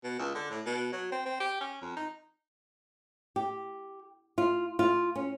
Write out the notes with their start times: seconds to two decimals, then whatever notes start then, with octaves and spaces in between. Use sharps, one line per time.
0.04 B2
0.19 C#2
0.35 D3
0.51 A2
0.66 B2
0.92 F#3
1.12 C4
1.26 C4
1.40 G4
1.61 C#4
1.82 F2
1.97 D#4
3.36 G4
4.38 F4
4.79 F4
5.16 C#4